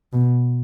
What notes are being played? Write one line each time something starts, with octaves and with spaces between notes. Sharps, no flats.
B2